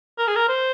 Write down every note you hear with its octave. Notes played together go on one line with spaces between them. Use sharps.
A#4
G#4
A#4
C5